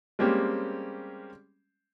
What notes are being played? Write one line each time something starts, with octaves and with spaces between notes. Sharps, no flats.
G3 G#3 A#3 C4 C#4 G4